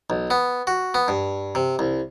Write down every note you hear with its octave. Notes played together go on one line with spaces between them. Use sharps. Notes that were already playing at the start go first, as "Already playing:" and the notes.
B1
B3
F#4
B3
G2
C3
C2